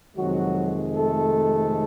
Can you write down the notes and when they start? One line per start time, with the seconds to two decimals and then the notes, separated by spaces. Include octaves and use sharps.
0.16 F2 C3 D#3 F#3 G#3 F#4
0.95 A3 A4